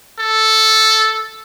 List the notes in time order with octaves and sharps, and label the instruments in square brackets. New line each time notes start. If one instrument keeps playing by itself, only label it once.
[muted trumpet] A4